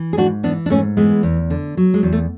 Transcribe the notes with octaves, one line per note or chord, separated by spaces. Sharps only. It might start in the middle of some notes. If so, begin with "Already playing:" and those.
Already playing: E3
G#4
G#2 D4 F#4
E3 B3 D4
D4
G#2 A3 C#4
E3 G#3 B3
E2
D3
F#3
G#3
E2
A3